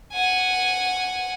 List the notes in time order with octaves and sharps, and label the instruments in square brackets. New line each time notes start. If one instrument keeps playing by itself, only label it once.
[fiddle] F#5 G#5